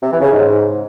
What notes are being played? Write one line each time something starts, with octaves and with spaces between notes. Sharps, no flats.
C3
E3
C#3
G#2